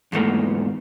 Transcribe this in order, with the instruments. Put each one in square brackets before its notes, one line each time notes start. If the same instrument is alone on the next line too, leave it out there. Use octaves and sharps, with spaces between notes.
[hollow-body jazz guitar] E2 G#2 A3 A#3